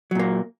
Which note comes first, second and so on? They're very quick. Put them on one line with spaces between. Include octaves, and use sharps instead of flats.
F#3 A#2 A#3